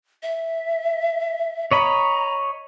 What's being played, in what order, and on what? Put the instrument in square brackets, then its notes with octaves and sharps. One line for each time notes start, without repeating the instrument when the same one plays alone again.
[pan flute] E5
[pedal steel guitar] C#5 D#5 B5 [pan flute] A#5